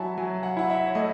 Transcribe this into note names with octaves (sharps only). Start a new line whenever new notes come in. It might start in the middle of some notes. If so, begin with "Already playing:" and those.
Already playing: F#3 E4 E5 F#5 G#5 A5
F#3 G#5
F#5
E4 F#5
E5
C#5
A3 D#5